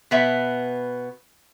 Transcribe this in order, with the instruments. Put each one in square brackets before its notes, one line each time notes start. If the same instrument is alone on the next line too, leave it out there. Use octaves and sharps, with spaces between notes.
[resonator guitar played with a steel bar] B2 B3 E5